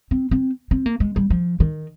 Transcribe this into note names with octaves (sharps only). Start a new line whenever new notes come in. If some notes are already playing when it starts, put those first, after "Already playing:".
C4
C4
C4
A#3
G#3
G3
F3
D#3